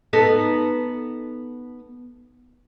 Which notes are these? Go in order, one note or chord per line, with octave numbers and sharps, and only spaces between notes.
B3 D#4 A4